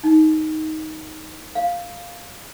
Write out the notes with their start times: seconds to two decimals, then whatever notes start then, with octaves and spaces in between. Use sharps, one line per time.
0.04 D#4
1.55 F5